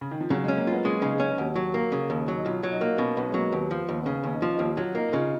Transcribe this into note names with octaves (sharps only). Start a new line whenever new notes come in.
C#3
D#3
F3
C#3 F#3
G#3
C#4
A#3
B3 F4
G#3 C#4
C#3 D#4
C#4
D#2 F#4
F#3
A#3
C#3
D#2
F#3
D#4
B1 F4
F#3
D#4
A#3
B2 C#4
B1 B3
G#3
F#3 A#3
D#2 B3
F3
D#2
B3
C#3 C#4
D#2 C#4
D#4
F3
D#4
D#2 F4
F#3 F4
A#3 D#4
D#4
C#3 F4